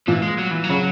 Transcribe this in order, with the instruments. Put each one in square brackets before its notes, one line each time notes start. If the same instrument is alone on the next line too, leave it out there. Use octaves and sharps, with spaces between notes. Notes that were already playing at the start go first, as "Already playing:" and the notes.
[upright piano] A#2 [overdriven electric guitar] E3
[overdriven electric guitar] G#3
F#3
E3
F#3
[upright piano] C#3